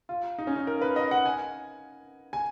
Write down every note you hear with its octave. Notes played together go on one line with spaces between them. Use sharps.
F4
D#4
C#4
D#4
A#4
B4
D#5
F#5
G#5
G#5